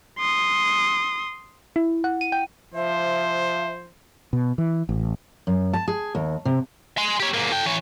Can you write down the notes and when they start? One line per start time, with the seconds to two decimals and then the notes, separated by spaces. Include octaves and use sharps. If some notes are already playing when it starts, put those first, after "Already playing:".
0.19 C6 D#6
1.76 E4
2.04 F#5
2.21 D#7
2.32 G5
2.74 F3 C5 E5
4.33 B2
4.58 E3
4.89 A1
5.47 F#2
5.73 A5
5.88 G#4
6.15 D#2
6.45 C3
6.98 G#5 C6
7.20 G4 C#5
7.34 G#2 A#3
7.52 A4 G5
7.66 E3 C#5